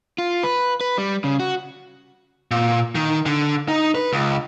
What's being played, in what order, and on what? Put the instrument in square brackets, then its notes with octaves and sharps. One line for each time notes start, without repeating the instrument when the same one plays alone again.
[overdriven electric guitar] F4
B4
B4
G3
C#3
F#4
[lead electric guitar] A#2
D#3
D3
D#4
B4
C#2